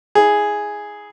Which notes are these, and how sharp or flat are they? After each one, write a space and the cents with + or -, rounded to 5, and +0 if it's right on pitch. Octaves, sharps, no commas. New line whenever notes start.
E4 -35 G#4 +0